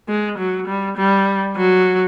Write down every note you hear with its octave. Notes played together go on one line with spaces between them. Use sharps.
G#3
F#3
G3
G3
F#3